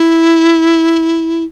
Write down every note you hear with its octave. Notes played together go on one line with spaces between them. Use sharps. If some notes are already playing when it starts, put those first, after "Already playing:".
Already playing: E4